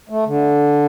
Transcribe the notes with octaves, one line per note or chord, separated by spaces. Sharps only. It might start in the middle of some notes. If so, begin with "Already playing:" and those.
A3
D3